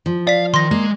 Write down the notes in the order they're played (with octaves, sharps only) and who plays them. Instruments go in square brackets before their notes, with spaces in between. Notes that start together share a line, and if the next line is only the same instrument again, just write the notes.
[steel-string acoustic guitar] F3
[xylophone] D5 B6 [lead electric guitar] F5
[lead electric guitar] D#3 [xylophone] C6 A#6
[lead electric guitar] G#3 [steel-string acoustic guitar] A#3